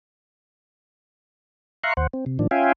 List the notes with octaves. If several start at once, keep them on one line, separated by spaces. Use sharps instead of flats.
E5 F5 A#5 C6 C#6 F#6
D#2 C5 F#5
C4
C3
A2 D#3 F3 D4
C#4 F4 E5 F5 G5 G#5